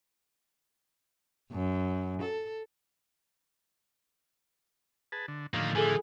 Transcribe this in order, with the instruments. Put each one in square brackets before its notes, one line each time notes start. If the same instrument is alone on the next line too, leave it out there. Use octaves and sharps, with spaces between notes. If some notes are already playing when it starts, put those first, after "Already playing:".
[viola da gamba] F#2
A4
[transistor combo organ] G#4 B4 A5
D3
[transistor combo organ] A2 D3 F3 [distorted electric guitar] D#3 A#3
[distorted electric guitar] E3 [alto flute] G#4 [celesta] A4 G#5